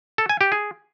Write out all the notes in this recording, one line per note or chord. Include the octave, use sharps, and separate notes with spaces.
A4
G#5
G4
G#4